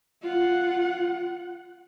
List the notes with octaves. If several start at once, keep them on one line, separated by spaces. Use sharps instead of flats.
F4 F#5